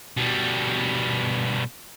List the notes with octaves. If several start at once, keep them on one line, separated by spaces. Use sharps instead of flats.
B2 G3